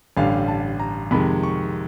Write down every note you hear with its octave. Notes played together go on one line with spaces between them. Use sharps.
A1 G2 D3 G3 F5
A5
A#5
F2 C3 D#3 G#3 B5
C#6